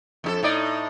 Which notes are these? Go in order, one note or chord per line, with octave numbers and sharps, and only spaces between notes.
F2 D#4 A4
A2 D#4 D5